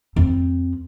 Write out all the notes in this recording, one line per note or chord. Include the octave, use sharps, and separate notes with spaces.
F2 C4